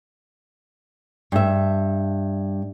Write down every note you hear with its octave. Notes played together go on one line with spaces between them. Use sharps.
G2 E5